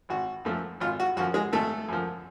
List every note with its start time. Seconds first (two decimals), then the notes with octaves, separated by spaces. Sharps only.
0.09 G#1 F#4
0.45 F#2 F3 A3
0.80 G#1 F4
1.00 F#4
1.16 F#2 F3 F#4
1.34 G#3 G#4
1.53 G#1 A3 A4
1.88 F#2 F3